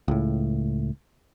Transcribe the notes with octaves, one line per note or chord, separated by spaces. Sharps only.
C#2 A2